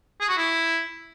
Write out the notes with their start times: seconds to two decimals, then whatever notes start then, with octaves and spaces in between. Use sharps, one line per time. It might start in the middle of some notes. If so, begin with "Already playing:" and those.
0.20 G#4
0.29 F#4
0.37 E4